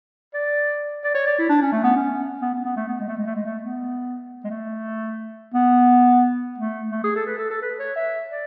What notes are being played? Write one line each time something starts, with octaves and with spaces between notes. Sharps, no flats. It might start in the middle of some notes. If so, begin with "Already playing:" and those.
D5
D5
C#5
D5
E4
D4
C#4
A3
B3
C#4
B3
B3
B3
A3
B3
G#3
A3
G#3
A3
G#3
A3
B3
G#3
A3
B3
A3
A3
G#4
A4
B4
A4
A4
B4
C#5
E5
D5